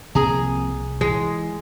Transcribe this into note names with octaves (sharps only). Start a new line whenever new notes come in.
C2 C3 F3 A#3 G#4 G#5 A#5
E3 G#3